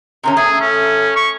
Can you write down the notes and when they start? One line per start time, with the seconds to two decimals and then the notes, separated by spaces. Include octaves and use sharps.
0.23 C3 D#3 C#4
0.37 A3 G#4
0.61 C#4
1.16 C#6